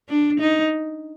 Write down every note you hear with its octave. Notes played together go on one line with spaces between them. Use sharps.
D4
D#4